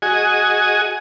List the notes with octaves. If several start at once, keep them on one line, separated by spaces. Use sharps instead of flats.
F#4 G#4 D#5 G#5